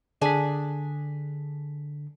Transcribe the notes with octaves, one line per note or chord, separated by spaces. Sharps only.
D3 D4 G#4 G#5 B6